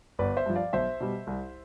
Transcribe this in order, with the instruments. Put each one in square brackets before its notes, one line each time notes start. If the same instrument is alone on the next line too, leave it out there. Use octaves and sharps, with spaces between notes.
[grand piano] G1 B4 D5
C5 E5
G2 F3
D5 F5
B1 C5 E5
B2 G3
C2